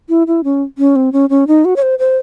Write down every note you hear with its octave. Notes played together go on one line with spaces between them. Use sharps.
E4
E4
C#4
C#4
C4
C#4
C#4
D#4
F#4
C#5
C5
C5